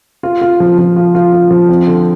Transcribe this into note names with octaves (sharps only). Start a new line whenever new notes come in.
F4
F4
F3
F3
F4
F4
F4
F3
C4
D3